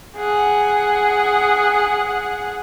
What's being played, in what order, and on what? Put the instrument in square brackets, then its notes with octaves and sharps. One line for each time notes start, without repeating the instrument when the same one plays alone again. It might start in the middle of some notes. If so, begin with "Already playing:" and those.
[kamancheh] G#4 F#5